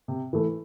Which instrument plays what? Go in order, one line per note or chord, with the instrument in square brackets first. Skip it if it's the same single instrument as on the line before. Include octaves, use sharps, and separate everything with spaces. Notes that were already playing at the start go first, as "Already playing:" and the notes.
[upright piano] C3
E3 A3